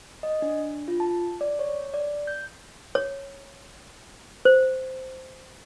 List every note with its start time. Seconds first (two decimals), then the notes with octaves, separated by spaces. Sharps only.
0.23 D#5
0.42 D4
0.88 F4
1.00 A5
1.41 D5
1.59 C#5
1.94 D5
2.27 G6
2.95 C#5
4.45 C5